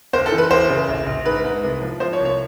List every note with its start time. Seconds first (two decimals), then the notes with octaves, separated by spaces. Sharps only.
0.13 F#1 C5
0.26 A4
0.32 E3
0.38 B4
0.51 F#1 C5
0.69 C#3
0.88 A#1
1.07 A#1
1.25 G#2 B4
1.44 G#2
1.63 C2
1.82 F3
2.00 F3 C5
2.13 C#5
2.19 C2
2.25 C#5